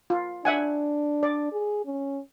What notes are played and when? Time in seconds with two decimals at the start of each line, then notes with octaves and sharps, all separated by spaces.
0.10 F4
0.45 D4 E5 F#5 G#5
1.23 D5
1.52 G#4
1.85 C#4